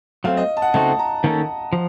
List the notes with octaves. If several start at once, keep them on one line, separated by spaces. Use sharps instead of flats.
F#3 A3 C4 F5
D#5
A5
F#5
C#3 A3 C4 D#4 F#4 A5
A#5
D#3 A#3 C#4 A4
F3